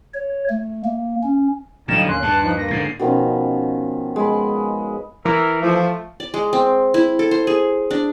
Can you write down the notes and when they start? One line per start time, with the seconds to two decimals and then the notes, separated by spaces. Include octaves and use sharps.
0.14 C#5
0.49 A3
0.85 A#3
1.23 C#4
1.88 A2 D3 F#3 G3 D#4 F5 E7
2.08 D#2 A#3 C#4 C6 F#6
2.22 G2 A5
2.43 F3 D#4
2.57 A#3 A#6
2.71 G#2 D3 C7
2.99 B2 D#3 F3 C#4
4.16 G#3 B4
5.25 E3 A#4
5.62 F3 A3
6.20 D5
6.34 G#3
6.53 C4
6.94 E4
7.19 A4
7.31 C5
7.47 G#4
7.91 D4